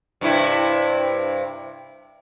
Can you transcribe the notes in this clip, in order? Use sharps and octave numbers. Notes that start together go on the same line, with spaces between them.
G2 C3 E4